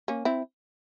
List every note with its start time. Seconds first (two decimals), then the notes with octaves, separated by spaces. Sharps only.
0.08 A#3 C#4
0.25 C4 E4